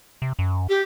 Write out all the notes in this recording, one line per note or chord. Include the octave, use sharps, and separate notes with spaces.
C3
F#2
G4